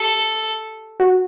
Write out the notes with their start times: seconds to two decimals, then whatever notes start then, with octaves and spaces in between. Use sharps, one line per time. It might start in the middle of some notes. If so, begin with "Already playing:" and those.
Already playing: G4 A4
1.00 F#4